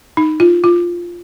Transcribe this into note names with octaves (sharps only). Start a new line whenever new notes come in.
D#4
F4
F4